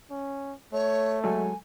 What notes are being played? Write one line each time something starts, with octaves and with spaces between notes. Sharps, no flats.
C#4
A3 C#5
F#3 G#3 A4 G#5